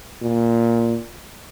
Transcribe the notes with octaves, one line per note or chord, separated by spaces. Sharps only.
A#2